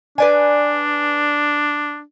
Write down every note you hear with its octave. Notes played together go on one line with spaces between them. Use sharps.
D4 B4 D5 G#5